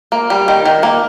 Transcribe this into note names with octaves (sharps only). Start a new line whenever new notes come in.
A#3
G3
D#3
D#3
A#3